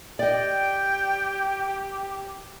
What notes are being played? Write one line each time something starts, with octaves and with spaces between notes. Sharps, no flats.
G4 D5 D#5 G5